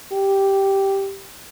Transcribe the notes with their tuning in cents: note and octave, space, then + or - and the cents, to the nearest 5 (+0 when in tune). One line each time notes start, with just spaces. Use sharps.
G4 -5